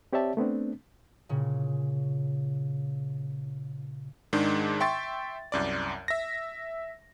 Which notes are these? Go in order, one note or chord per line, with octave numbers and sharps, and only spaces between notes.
C4 G4 C#5 D5 E5 A5
A3 B3 C4 D4
A#2 C#3
G#2 D#3 G#3 D4
E5 G5 C6 C#6 A6
C2 F#2 D5
E5 A#6